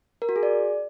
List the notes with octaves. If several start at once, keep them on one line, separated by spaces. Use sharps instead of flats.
A#4
F#4
G#4
D5